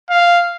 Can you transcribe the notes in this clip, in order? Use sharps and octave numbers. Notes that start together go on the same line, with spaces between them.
F5